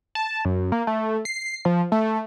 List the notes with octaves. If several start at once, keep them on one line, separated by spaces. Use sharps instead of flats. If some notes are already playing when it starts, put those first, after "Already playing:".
A5
F#2
A#3
A3
C7
F3
A3